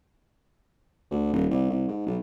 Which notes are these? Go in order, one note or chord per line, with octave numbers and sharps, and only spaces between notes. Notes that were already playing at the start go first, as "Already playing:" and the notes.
D2
D#1
C2
C2
G#2
B1